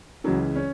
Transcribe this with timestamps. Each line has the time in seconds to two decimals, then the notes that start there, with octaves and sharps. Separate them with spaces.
0.24 C#2 C#3 E3 F#3
0.56 C#4